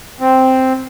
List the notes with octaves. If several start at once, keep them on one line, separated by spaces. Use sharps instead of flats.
C4